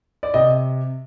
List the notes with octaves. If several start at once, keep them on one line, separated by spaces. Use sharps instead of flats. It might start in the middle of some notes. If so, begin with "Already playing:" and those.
D5
C3 D#5